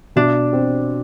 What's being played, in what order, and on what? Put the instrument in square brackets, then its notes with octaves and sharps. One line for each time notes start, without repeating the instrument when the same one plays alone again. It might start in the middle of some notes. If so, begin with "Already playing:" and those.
[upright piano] B2 [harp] D4
[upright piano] C4